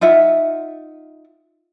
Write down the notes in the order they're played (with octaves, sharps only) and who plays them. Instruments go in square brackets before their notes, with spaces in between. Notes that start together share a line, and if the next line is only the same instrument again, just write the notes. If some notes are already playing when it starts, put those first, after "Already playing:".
[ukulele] D#4 F4 E5 F#5